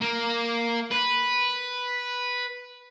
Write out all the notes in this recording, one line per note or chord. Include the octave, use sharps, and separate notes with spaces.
A#3
B4